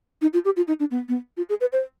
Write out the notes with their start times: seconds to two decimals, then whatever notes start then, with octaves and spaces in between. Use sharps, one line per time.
0.22 D#4
0.33 F4
0.45 G4
0.56 F4
0.68 D#4
0.80 D4
0.91 B3
1.08 B3
1.37 F4
1.49 G#4
1.61 B4
1.72 C5